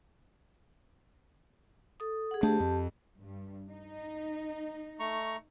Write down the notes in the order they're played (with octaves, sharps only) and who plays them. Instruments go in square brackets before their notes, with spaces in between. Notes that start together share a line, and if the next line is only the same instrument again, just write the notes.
[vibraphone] A4 D#6
G#4 F#5
[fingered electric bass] A3 D4 [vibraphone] G4 A5
[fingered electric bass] F2
[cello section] G2
D#4
[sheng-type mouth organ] A3 A#5 C#6